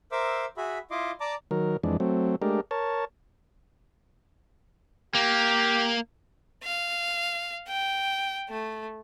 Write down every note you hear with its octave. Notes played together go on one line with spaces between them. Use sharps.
A#4 C5 E5 D6 E6
F#4 G#4 E5 B5
E4 F4 D#5 C6 D6
D5 A5 A#5 D6
D#3 F#3 A#4
F2 E3 G#3 D4
F#3 A3 C4
G#3 A3 D4 G4 A#4
A#4 C#5 A5
A#3 G4
F5
G5
A3